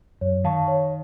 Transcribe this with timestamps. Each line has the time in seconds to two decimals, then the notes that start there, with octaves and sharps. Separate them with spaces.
0.21 F#2 C#5
0.44 D#3 F5 A5 C#6
0.68 C#5